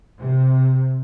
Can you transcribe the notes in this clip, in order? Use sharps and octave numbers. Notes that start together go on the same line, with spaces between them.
C3